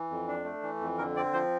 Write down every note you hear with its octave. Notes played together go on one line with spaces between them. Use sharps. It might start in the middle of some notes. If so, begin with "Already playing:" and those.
Already playing: E3
F2
D4
A3
E3
F2
D3 A#4
C4 D5
F3 C5